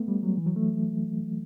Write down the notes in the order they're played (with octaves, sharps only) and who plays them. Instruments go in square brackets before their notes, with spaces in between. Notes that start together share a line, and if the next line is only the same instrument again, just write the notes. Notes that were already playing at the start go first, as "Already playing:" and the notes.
Already playing: [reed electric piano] A3 B3
G3
F#3
E3
F#3
A3